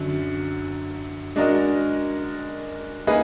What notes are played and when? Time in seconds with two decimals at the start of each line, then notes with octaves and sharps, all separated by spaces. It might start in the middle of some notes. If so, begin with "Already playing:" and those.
Already playing: F#2 D3 F#3
1.36 G#3 D4 F#4 A#4 D#5
3.07 A#3 D#4 G#4 B4